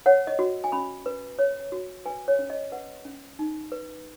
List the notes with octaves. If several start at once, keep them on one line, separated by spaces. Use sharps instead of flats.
C#5 F#5
D#5
F#4
G#5
C#4 B5
B4
C#5
F#4
B4 G#5
C#5
C#4
D#5
B4 F#5
C#4
D#4
B4